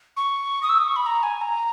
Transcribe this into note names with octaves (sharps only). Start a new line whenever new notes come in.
C#6
D#6
E6
D#6
C#6
B5
A#5
G#5
A#5